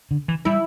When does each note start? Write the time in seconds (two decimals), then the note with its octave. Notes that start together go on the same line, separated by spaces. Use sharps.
0.11 D3
0.28 E3
0.45 G3 E4